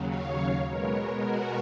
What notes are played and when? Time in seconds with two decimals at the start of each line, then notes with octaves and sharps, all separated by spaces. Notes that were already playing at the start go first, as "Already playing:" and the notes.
Already playing: D#2 C#3 F#3
0.08 C#5 F5
0.64 B2 G#3 B3 A#4 C#5
1.20 F#4 A#4